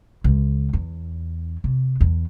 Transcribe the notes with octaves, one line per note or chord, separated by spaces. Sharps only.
C#2
E2
C3
E2